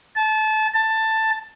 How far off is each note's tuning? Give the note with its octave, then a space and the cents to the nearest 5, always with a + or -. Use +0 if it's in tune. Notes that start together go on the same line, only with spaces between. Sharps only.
A5 -25
A5 +10